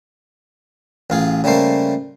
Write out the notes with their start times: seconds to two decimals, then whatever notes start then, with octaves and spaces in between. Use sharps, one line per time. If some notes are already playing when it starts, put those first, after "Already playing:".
1.10 A1 F4 G#4
1.44 C#3 G3 A3 A#3 C5